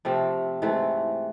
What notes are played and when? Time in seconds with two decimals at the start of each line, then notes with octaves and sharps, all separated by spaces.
0.05 C3 F3 A3 C4
0.62 G#2 E3 A3 C4